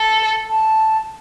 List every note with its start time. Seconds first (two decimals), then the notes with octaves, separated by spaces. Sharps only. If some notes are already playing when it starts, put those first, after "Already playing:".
Already playing: A4
0.48 A5